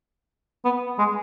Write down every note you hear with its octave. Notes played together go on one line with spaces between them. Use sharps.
B3
G#3